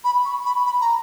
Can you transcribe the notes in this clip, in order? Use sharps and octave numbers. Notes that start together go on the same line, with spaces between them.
B5
C#6
B5
B5
A#5